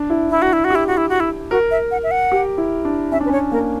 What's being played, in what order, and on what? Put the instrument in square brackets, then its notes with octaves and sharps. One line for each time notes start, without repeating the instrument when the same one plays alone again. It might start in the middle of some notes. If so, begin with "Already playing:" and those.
Already playing: [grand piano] D4
E4
[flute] E4
F#4
E4
F#4
[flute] E4 [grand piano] G4
[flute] F#4
E4
F#4
E4
[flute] F#4 [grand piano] A#4
[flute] E5
F#5
E5
F#5
[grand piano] G4
E4
D4
[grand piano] C#4 [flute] E5
[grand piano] D4
[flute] B4
[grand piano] C#4 [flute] C#5
[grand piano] A#3 [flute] A#4